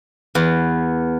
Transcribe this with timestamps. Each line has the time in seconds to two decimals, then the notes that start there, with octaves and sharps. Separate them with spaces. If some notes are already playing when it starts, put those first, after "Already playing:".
0.35 E2